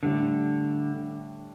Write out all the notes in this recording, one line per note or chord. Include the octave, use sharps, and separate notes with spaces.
A2 D3 G3 D4